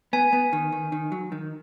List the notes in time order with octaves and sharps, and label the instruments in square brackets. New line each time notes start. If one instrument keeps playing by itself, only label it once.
[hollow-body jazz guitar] B3 [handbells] G#5
[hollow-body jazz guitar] B3
D#3
D#3
D#3
F#3
D#3